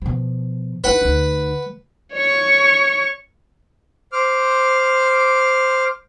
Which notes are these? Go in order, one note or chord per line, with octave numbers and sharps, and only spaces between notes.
B2 F3
D#4 E4 B4 F#5
D2 D#4
C#5 C#6
C5 D6 F6